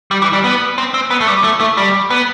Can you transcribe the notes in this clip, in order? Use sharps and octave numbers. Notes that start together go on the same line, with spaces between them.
G3
E3
G3
B3
C4
C4
B3
A3
G3
A3
A3
G3
B3